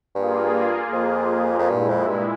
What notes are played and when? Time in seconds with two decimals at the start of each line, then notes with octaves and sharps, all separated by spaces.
0.15 G2 A#3 F4 G#4
0.92 F2
1.59 F2
1.69 G2 A#2 G#3 E4
1.88 F2
2.08 G2